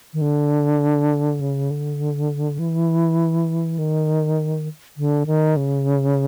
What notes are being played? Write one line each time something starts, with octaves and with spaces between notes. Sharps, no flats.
D#3
D3
C#3
D3
E3
D#3
D3
D#3
C#3